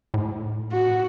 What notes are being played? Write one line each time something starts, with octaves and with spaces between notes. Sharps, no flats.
A2
F#4